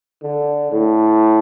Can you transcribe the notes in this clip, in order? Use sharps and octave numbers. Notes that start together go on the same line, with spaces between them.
D3
A2